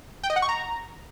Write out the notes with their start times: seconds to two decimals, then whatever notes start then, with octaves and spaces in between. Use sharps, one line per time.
0.24 G5
0.30 D#5
0.36 F#5
0.42 C#6
0.49 A#5